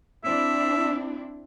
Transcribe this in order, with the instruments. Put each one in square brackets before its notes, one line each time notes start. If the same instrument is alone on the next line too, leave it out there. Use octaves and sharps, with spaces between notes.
[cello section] C4 D4 E4 [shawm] E5